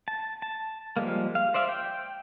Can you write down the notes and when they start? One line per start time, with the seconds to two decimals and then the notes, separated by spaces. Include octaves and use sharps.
0.08 A5
0.42 A5
0.97 F3 G3 G#3 A#3
1.35 F5
1.54 C5 D5 E5 F5
1.69 G5